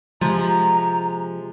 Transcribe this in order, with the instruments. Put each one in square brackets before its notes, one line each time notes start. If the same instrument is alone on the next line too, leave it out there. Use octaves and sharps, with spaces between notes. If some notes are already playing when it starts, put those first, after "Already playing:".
[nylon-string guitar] C3 G#3 [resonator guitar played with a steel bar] F3 [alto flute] A#5